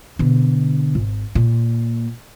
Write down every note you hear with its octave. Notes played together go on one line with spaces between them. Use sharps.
B2 D3
G#1
A#2